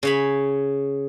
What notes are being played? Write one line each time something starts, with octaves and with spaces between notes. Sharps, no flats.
C#3 C#5 B5